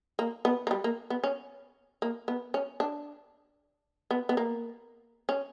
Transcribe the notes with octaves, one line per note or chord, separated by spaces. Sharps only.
A#3
B3
A#3
G3
A#3
B3
C#4
A#3
B3
C#4
D4
B3
B3
A#3
C#4